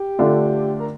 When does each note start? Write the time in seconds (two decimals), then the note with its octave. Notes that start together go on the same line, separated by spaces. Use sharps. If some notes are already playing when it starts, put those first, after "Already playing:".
Already playing: G4
0.19 D3 A3 D4 F4 A4
0.80 A#4